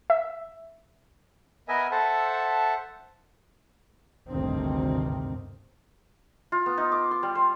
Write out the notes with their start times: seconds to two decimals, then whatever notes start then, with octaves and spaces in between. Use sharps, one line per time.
0.10 E5
1.68 B3 A#4 B4 D#5 E5 G#5
1.91 A4 C5 E5 F#5 A5
4.28 G#1 D2 G2 C3 D#3 C4
6.52 F4
6.66 B3
6.78 D#4
6.92 D6
7.11 C6
7.23 G3
7.35 C5